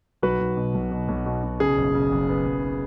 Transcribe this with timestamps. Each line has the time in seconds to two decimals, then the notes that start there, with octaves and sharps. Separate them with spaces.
0.23 B1 F#4 B4
0.40 B1
0.57 B2
0.74 B1
0.92 B2
1.09 B1
1.26 B2
1.43 B2
1.60 C#3 G#4
1.78 F#1
1.95 C#3
2.12 F#1
2.29 B3
2.46 F#1